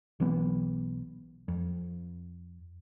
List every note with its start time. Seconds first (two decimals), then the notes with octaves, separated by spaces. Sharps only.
0.20 B1 E3 F#3 B3
1.48 F2